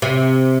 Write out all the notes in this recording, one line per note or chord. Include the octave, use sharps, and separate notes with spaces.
C3